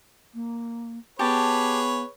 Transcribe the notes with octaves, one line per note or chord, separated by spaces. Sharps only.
A#3
B3 G4 G#4 B4 C#5 A5